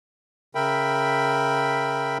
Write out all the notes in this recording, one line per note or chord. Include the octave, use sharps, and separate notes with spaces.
C#3 A#4 E5 G5 B5